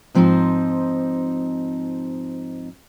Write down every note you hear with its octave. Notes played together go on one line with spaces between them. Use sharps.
G#2 F3 C4 C#4 D#4